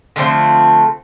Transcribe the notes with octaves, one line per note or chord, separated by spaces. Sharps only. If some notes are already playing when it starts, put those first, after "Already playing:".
D3 F3 A3 C4